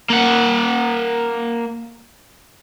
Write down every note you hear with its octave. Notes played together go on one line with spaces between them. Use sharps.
A#3 F#5